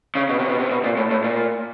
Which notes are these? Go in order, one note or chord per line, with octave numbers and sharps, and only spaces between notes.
C#3
B2
C3
B2
C3
B2
A#2
A2
A2
A#2